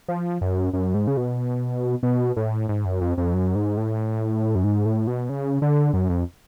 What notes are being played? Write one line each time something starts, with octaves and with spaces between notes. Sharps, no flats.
F3
F#2
F#2
G#2
C#3
B2
B2
A2
G#2
F#2
F2
F2
F#2
G#2
A2
F#2
G#2
A2
B2
C#3
D3
F#2
F2